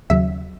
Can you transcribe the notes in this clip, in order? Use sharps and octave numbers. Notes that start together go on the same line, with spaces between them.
D#2 C#3 F#3 E5